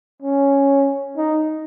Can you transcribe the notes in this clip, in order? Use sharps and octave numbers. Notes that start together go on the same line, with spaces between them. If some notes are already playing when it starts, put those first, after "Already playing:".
C#4
D#4